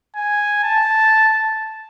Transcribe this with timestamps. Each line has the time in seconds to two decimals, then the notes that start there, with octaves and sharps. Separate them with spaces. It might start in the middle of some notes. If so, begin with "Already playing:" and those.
0.16 G#5
0.63 A5